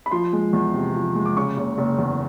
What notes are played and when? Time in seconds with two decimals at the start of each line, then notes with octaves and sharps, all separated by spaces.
0.06 B5
0.11 F3 C6
0.33 G#3
0.53 E2
0.74 C3
0.95 F3
1.15 G#3
1.25 D6
1.37 C#3 C#6
1.57 F#1
1.78 F#1
1.99 E2